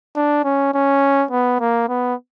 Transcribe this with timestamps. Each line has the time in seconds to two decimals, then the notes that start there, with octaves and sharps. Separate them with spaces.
0.16 D4
0.44 C#4
0.74 C#4
1.31 B3
1.60 A#3
1.88 B3